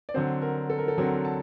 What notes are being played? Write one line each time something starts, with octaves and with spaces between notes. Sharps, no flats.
D5
D3 F#3 C4 C5
A#4
A4
A#4
A4
D3 F#3 C4 A#4
A5